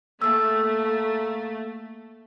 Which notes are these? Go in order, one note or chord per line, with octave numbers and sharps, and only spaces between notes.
A2 A3 A#3 G#4 E6